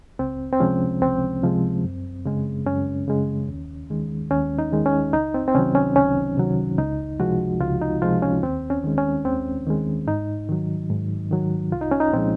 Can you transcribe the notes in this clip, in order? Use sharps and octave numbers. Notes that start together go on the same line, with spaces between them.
C#2 C4
C4
C3 F3 G#3 C#4
C#2 C4
C3 F3 G#3
F#2
C#3 G#3
F#2 C#4
C#3 G#3
D#2
D#3 G#3
D#2 C#4
D#4
D#3 G#3
C#4
C#2 D#4
C4
C4
C3 D#3 F#3 C#4
C#4
C#2 C#4
C3 D#3 F#3
C#2 D#4
C3 F3 G#3 F#4
C#2 F4
D#4
C3 F3 G#3 F4
C#4
D#2 C4
C#4
D#3 G#3
C#4
D#2 C4
D#3 G#3
G#2 D#4
D#3 F#3
G#2
D#3 F#3
C2 F4
D#4
C#4
D#4
A#2 F3 G#3 C4